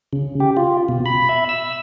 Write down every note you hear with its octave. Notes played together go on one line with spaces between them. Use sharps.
C#3
G4
F4
B2
B5
E5
E6